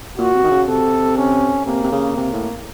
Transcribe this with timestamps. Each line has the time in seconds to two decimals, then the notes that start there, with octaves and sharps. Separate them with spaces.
0.18 A#2 F#4
0.34 C3
0.44 D#3
0.51 C#3
0.68 C3 A4
1.17 C#4
1.66 C3 A#3
1.84 C3
1.92 C#3
2.16 C3
2.33 A2